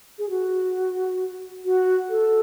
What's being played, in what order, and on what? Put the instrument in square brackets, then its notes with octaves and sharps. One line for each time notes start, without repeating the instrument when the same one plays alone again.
[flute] G#4
F#4
F#4
A4